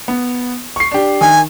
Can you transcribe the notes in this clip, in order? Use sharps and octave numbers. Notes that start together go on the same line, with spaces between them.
B3
C#6 C7
D4 G4
D#3 G#5